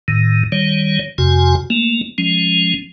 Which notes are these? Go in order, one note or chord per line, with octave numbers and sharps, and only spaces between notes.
A2 D#3
D#3 G3 C#5
F2 C3 F#4 G#5
A3 A#3
F3 G#3 C#4